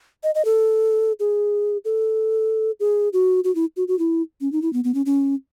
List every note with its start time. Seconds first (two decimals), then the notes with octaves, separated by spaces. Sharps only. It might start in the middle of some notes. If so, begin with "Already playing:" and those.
0.23 D#5
0.35 D#5
0.45 A4
1.20 G#4
1.85 A4
2.80 G#4
3.13 F#4
3.44 F#4
3.55 E4
3.77 F#4
3.88 F#4
3.99 E4
4.41 C#4
4.52 D#4
4.62 E4
4.73 B3
4.84 B3
4.94 C#4
5.06 C#4